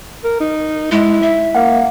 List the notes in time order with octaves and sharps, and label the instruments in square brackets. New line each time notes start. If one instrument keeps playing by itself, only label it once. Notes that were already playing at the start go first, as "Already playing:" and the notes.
[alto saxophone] A#4
D#4
[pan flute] G#3 [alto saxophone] E4
[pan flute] E5
[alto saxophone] A#3 [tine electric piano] F5 F#5